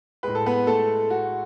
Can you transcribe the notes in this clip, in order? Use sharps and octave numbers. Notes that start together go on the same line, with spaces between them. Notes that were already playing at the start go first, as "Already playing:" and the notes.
A2 G#3 B4
A4
B3 B4
A3 A4
F#4